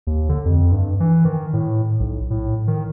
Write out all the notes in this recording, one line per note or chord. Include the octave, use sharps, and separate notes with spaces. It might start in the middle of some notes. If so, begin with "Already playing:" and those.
D#2
D3
F2
G2
E3
D#3
A2
B1
A2
D#3